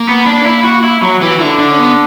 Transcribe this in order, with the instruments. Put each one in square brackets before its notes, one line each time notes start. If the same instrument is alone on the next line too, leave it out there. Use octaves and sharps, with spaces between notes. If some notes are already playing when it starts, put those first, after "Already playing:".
Already playing: [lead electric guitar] A#3
[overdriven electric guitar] B3
D4
E4
F#4
E4
F#3
[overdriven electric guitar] E3 [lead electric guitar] G4
[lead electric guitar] F#4
[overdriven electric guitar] D3 [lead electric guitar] E4
[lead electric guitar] D4
C#4
B3